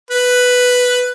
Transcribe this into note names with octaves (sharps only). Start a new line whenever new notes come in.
B4